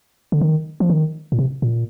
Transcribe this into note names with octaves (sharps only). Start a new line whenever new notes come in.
D3
D#3
F3
D#3
A#2
C3
A#2